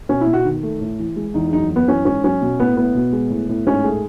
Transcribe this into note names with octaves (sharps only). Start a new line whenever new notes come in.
B2 C#4
E4
B2
F#4
D#3
A3
A2
E3
G#3
E2 D#4
F#2 D#4
F#2
B3
E3 C#4
G#2 C#4
F#3 C#4
B2
A2 B3
A2 B3
B2
G#3
A2
A2
G#2 C#4
A3 G#4